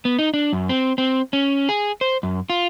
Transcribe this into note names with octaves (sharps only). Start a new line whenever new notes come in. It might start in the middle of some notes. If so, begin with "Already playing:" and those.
B3
D#4
D4
F#2
C4
C4
C#4
G#4
C5
F#2
F4